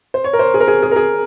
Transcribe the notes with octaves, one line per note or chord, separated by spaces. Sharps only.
C5
C#5
A#4
C5
G#4
A#4
G#4
G#4
A#4
G#4